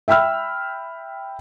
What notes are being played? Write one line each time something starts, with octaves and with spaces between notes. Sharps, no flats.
E5 G5 B5 E6 F6